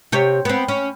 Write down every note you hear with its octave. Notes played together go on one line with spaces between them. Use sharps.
C3 G4 C#5
B3 C4
C#4